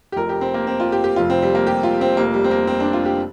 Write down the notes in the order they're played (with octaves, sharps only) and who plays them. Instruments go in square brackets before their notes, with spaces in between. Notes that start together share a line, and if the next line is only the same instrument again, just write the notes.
[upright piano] G4
F1 F2 F3 A#4
G4
C4
A#3
C4
F4
G4
G4
F1 F2 C3 F4
C4
G3
A#3
G4
F4
C4
F1 F2 C3 F3 A#3
G3
C4
A#3
C4
D4
F4
G4